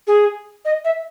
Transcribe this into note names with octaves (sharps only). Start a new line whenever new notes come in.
G#4
D#5
E5